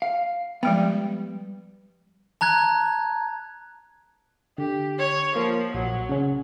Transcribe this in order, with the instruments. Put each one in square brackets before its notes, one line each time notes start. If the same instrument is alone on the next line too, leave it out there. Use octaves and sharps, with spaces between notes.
[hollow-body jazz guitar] F5
[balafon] F3 G#3 G5 [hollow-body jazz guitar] G3 B3
[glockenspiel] A5 A#5 F#6 G#6
[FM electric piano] D3 [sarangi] G4
[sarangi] C#5
[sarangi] F3 [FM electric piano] A#3
[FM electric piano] A#1 [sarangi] F#3
[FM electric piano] C#3 C#4